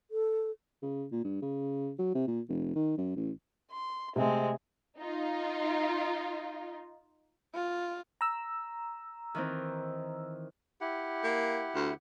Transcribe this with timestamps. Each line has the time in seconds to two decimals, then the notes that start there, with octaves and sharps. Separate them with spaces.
0.11 A4
0.82 C#3
1.12 A#2
1.24 G2
1.42 C#3
1.99 F#3
2.15 C3
2.27 A#2
2.49 F1
2.75 D#3
2.98 F#2
3.16 A1
3.72 C6
4.16 C3 G#3 A3 C4
4.97 D#4 F4
7.54 F4
8.21 A#5 E6
9.35 D#3 E3 C4
10.81 E4 G4 F#5
11.24 A#3
11.75 D2